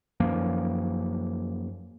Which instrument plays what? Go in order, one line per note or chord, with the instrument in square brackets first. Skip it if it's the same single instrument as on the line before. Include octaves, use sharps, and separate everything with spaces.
[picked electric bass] F#2 F3 A#3